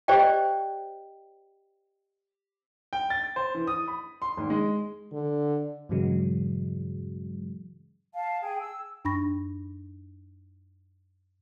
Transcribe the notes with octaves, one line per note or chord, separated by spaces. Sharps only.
G4 C5 D5 D#5 G5
G5
A6
C5
E3
D#6
B5
C6
G#1
G#3
D3
G2 A#2 C#3 E3 F#3 G#3
F5 A5
G#4 G5
E6
F#2 D4 B5 C#6 A#6